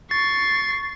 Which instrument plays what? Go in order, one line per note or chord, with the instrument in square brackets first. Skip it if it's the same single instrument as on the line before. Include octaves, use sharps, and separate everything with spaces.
[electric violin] C#6 C7 [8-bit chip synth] A6